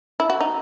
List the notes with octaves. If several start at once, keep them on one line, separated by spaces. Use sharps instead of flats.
E4
F#4
D#4